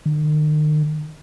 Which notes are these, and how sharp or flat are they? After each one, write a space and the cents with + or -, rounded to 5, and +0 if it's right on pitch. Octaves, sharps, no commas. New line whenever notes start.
D#3 -40